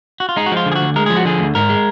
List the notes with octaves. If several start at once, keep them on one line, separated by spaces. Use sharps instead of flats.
F#4
F4
G#3 D#4
F#4
F3 F4
D3
G#4
F#4
D2
G#3 A#4
F3 G#4
F#4
D3 G#4
D2
G#2 A#4
G#3